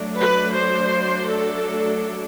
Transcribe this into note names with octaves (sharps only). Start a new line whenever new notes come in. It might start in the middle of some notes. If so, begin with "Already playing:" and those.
Already playing: F#3 A3 D4
B4
C5
A4